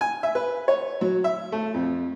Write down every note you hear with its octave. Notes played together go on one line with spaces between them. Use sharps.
G#5
E5
B4
C#5
F#3
E5
A3
F2